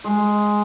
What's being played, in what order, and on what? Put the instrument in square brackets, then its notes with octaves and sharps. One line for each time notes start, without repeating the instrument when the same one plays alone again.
[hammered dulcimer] G#3